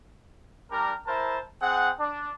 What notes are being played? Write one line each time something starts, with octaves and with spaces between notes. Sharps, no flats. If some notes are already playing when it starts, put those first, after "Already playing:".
G3 D4 A#4
E4 A#4 C5 A5
C4 G#4 F#5
D4